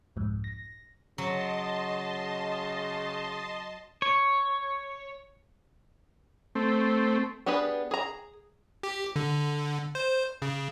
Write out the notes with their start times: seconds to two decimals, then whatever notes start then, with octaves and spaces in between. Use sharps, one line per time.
0.16 C2 F2 G#2
0.44 A#6
1.18 C#3 F#3 D#5 A5 C6
4.02 C#5
6.55 A3 C4
7.46 B3 D4 G4 G#4 B4
7.91 G#4 A#5
8.83 G4
9.16 D3
9.95 C5
10.42 C#3